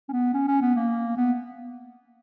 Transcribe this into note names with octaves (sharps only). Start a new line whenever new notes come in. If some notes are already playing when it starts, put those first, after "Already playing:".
C#4
B3
C#4
C#4
B3
A#3
B3